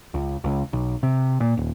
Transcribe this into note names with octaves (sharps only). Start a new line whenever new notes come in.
C#2
C#2
B1
C3
A#2
D#1